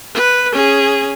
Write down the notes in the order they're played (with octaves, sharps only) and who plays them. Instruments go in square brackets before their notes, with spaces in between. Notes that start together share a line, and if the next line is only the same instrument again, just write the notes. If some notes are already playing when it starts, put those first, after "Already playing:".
[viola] B4
C#4 G#4